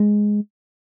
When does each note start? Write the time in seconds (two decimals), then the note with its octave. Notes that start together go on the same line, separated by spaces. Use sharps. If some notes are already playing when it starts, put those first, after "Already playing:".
Already playing: G#3